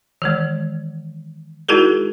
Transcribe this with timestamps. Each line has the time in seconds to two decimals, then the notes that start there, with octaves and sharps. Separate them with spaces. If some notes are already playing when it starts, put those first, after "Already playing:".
0.22 D#3 E3 G#3
1.69 G#3 D#4 E4 F#4 G#4 A#4